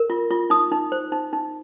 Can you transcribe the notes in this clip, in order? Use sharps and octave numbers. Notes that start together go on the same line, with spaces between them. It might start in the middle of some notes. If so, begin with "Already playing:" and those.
Already playing: A#4
F4
F4
D#4 D#6
D#4
C5
D#4
D#4